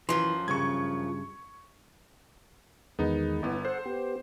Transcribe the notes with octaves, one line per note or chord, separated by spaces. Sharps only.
F#2 E3 F3 C6
G2 C#3 C#6 G#6
E2 D#3 G#3 B3 D#4
G1 B3 E4
A4 C5 F#5
B3 G4